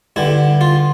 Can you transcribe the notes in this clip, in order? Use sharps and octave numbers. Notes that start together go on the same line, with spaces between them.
G2 D3 E4
F4